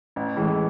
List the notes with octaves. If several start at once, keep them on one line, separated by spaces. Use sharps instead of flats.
A1
A2 E3 G#3